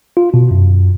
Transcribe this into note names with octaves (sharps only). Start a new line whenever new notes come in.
F4
B2
F#2